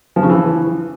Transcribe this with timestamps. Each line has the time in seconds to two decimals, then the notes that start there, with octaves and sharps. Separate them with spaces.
0.16 F3
0.23 C#3
0.30 E3